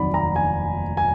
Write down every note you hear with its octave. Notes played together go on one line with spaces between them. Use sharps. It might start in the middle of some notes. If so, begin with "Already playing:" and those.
Already playing: F1 D#2 D#3 F#3 D5 B5
A#5
G#5
G#5